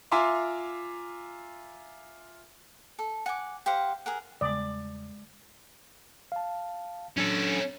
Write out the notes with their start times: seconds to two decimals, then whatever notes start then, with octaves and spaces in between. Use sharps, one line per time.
0.12 F4 E5 G#5 A#5 C6 D6
2.99 A4
3.26 F#5 G#5 D6
3.66 G4 C5 F5 F#5
4.06 G#4 A#4 F#5
4.41 E2 C#3 G3 G#3 D5 D#6
6.32 F5 A5
7.17 F#3 C#4 D4 A4